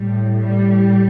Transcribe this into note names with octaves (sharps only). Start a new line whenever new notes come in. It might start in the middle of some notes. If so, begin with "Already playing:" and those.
Already playing: A2 G3
G3